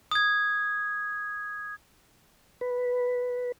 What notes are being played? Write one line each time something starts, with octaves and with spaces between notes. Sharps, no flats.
D#6 G#6
B4